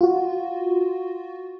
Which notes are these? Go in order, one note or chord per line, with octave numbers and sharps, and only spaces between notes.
F4 F#4